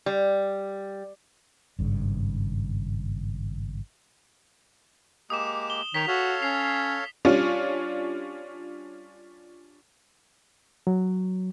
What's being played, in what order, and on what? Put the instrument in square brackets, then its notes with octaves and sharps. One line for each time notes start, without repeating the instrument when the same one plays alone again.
[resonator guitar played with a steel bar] G3
[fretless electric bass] G#1 G2 A#2 C#3
[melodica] G#3 A#3 G4 [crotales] D#6 E7
[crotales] G7
[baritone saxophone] D#3 [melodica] C#5 [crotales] B6 F7
[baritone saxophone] F#4 [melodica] A4 C#5 F5
[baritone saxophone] C#4 [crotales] C7 F7
[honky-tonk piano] G3 C#4 D4 F4
[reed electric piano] F#3